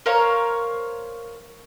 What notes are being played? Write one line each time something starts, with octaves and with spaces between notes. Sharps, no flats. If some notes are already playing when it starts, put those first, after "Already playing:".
A#4 C5 C#5 F5